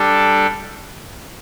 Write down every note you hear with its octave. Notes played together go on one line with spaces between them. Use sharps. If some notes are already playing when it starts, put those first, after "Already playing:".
Already playing: G3 D4 A4